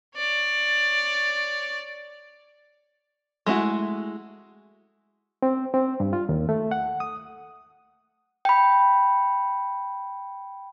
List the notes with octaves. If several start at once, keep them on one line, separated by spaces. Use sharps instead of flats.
C#5 D5
G#3 A3 E4 F#4
C4
C4
G2
F4
D#2
A3
F#5
D#6
G5 B5